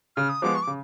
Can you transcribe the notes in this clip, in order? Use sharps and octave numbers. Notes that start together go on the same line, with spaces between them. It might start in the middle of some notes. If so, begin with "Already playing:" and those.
C#3 F6
D#6
F3 G#3 B3 D6
C#6
D6
C#3